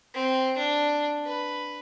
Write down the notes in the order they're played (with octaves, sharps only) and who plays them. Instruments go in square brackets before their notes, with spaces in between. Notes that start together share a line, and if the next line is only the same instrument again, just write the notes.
[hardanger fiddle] C4
D4
B4